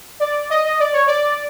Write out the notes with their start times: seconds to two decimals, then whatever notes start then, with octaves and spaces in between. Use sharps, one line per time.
0.20 D5
0.50 D#5
0.65 D#5
0.79 D5
0.93 C#5
1.07 D5